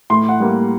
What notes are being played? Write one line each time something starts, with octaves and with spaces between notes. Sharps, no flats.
A2 C6
F#5
G3 A#3